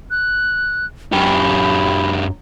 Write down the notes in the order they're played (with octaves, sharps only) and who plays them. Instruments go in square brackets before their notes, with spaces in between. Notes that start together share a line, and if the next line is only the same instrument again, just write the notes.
[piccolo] F#6
[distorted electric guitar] F#2 G4 [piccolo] B5